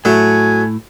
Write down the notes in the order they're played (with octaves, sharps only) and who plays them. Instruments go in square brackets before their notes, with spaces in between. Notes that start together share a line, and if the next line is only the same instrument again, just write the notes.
[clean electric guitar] A2 [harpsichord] F#3 [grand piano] A3 [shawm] G#5